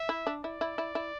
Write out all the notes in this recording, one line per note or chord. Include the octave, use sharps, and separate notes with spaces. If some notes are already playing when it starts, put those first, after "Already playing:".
Already playing: E5
E4
D4
E4 D5
E4
E4
E4